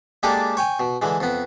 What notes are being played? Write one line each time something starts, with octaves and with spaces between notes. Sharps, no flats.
G#3 A#3 D4 G4 A4
C#5 G5 G#5
B2
D3 E3 G#3
F2 B3